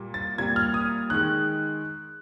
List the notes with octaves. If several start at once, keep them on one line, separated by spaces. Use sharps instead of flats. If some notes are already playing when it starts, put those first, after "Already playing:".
Already playing: A#2 G3 A#3
A6
A#2 G3 A#3 G#6
F6
D#6
D#3 G#3 F#6